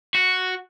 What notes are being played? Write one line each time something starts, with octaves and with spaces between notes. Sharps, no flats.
F#4